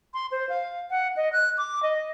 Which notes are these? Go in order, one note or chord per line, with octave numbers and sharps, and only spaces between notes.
C6
C5
F5
F#5
D#5
F#6
D6
D#5